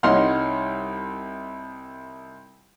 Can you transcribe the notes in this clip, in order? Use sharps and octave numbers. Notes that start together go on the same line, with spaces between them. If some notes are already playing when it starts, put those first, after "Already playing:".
C2 D#4 C#5 F#5 C6 F6